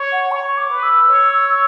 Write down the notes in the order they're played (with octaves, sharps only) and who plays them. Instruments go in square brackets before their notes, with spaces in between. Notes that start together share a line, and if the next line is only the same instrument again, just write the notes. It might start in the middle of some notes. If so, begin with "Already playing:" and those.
Already playing: [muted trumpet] C#5
[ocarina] F#5
[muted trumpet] C#5 [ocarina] C#6
[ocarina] D6
[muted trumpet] B4
[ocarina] E6
[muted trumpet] C#5